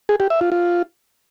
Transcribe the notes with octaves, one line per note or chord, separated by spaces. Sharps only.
G#4
G4
E5
F4
F4